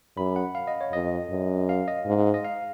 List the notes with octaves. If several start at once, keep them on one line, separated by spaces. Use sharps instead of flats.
F#2 B5
F#5
F5
D#5
C#5
F2 D#5
F#2
F5
D#5
G#2
D#5
F5